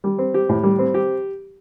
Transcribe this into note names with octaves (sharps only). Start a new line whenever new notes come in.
G3
C4
G4
A2
G3
C4
G4